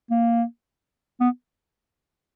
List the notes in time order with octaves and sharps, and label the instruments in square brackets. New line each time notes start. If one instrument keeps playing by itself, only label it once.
[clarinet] A#3
B3